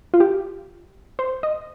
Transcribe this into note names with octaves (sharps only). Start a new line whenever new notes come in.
F4
G4
C5
D#5